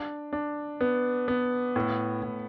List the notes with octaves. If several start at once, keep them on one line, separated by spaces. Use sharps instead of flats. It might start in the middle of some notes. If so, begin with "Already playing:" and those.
Already playing: D4
D4
B3
B3
A2
A2